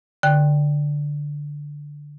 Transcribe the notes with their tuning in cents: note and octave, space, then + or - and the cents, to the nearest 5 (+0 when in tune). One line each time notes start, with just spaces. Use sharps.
D3 +0 G5 +0